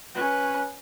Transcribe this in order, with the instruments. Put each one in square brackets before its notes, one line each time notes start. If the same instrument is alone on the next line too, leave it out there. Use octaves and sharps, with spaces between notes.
[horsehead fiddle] C#4 B4